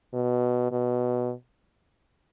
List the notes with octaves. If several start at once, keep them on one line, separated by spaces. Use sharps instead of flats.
B2
B2